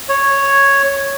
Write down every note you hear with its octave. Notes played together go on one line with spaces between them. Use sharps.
C#5